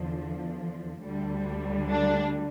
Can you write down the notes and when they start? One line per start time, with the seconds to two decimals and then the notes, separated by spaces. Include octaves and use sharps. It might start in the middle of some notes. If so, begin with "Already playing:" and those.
Already playing: E2 D3 F3
1.00 D2 D3 G3
1.90 D4